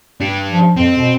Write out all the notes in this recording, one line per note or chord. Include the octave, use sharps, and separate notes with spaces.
D4 G4
F3
F2 C4
B2